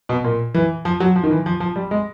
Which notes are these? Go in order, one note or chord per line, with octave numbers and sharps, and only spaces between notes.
B2
A#2
E3
F3
F#3
F3
D#3
E3
F3
F3
G3
G#3